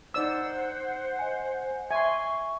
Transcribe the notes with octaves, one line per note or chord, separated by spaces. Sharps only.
D#4 C5 D5 F#5 E6
D#5 G#5
E5 G#5 C6 C#6